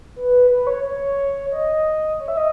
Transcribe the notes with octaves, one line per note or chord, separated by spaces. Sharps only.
B4
B4
C#5
C#5
D#5
C#5
E5
D#5